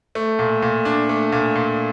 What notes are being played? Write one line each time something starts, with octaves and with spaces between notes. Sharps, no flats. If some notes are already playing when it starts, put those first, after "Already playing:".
A3
A#2
A#2
D4
A3
A#2
A#2